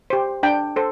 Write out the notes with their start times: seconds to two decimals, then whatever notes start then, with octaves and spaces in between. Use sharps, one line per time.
0.10 G4 C5
0.43 D4 G5
0.76 A4 C5